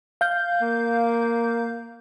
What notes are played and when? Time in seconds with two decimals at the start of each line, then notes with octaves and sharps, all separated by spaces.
0.21 F5 G6
0.61 A#3